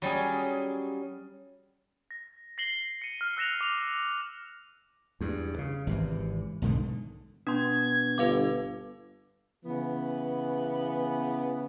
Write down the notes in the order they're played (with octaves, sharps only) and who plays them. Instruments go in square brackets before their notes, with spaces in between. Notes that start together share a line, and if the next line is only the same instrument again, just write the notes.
[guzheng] F#3 G3 C#4 G#4
[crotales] A#6
A#6 C7 F#7 G7
C#7 D#7
F6
E6 F#6 A#6 E7 F7
D6 F7
[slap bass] E2 G2
C#3
G#1 C3 E3
B1 G#2 D3 D#3
[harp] B2 [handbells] D4 C6 [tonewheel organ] G#6
[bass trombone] G1 [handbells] B4 F5 D6
[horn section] C#3 E3 B3